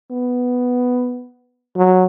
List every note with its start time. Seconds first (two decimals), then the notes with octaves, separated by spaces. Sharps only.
0.11 B3
1.77 F#3